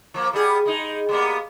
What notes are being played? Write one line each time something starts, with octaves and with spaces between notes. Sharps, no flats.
F3 A#3
G3 B3 G#4
G#3 D#4
G3 A#3 B3